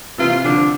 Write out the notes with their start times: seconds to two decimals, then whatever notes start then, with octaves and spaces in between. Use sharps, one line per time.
0.18 C3 E3 F4
0.44 D3 F3 D4